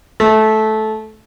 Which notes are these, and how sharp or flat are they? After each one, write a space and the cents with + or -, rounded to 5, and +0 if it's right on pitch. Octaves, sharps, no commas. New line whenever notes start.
A3 -15